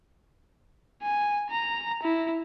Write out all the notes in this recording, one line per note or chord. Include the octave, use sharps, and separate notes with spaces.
G#5
A#5
E4